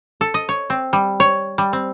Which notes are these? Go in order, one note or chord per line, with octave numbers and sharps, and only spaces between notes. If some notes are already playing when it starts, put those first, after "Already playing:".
A4
D#5
C#5
C4
G3
C#5
G3
C4